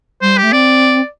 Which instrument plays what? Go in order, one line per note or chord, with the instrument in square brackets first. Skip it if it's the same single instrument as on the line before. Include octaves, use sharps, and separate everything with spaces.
[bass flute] G3 [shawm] C5
[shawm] G4
[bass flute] A3
[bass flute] C4 [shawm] D5